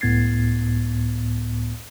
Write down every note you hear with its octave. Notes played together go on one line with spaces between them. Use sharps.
C#2 A2 B3 G#6 A6 C7